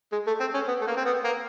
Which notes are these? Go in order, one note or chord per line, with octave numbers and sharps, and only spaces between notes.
G#3
A3
C4
C#4
B3
A3
A#3
C4
B3
A#3